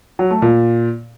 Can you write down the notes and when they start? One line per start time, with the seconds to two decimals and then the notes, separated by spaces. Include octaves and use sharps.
0.19 F#3
0.31 A3
0.42 A#2